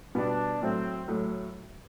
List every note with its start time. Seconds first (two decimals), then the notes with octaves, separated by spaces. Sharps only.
0.15 B2 G3 B3 D4
0.61 A2 F#3 A3 C4
1.08 A2 F#3 A3